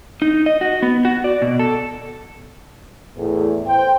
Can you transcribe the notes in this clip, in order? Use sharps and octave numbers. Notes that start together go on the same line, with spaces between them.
D#4
D#5
F#4
B3
F#4
D5
B2
A4
E2 A2
C5 G5